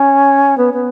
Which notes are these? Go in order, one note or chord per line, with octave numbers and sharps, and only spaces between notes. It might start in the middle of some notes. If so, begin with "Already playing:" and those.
Already playing: C#4
B3
B3